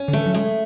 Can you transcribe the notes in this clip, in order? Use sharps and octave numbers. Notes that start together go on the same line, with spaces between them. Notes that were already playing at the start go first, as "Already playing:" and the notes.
Already playing: C#4
D3
E3 A3
F#3
G#3 A3